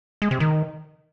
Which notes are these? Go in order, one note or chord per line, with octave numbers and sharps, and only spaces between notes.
G#3
C3
D#3